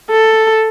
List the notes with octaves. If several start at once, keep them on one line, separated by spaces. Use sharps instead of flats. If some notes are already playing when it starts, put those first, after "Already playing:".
A4